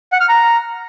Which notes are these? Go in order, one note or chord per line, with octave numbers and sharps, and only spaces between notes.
F#5
F6
A#5